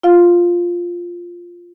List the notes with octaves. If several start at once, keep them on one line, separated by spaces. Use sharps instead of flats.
F4 F5